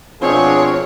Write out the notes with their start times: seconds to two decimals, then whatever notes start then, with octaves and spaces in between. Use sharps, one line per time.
0.22 B2 F3 C4 D4 G#4 C#5